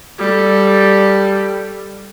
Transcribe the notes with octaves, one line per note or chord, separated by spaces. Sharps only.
G3 A4